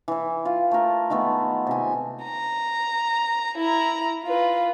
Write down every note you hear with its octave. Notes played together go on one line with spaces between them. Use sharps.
E3 E4
F4
A3 A#4
D#3 G#3 A3 B3
C3 G#5
A#5
E4 A#5
F4 B4